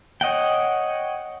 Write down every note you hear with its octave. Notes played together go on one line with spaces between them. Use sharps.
C#5 D#5 F#5 G5